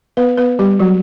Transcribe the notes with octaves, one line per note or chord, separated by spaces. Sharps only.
B3 B4
B3 B4
G3 G4
F#3 F#4